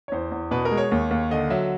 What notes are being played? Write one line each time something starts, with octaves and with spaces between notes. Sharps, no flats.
C#5
E2 C5
E2
B2 B4
A#4
G#3
C#5
D#2
D#2
D3 D#5
F#3 E5